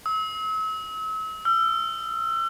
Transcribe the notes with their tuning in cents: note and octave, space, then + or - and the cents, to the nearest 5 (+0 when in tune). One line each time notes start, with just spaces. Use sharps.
E6 -40
E6 +40